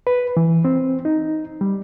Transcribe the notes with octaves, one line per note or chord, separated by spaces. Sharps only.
B4
E3
C4
D#4
G3